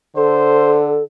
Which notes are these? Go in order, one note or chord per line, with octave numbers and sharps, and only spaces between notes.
D3 A4 C5